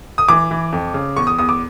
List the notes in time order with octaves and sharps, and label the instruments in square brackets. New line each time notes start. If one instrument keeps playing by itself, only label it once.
[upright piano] D#6
E3 D6
E3
F2
C#3
E2 C#6
D#6
E2 D#6
D6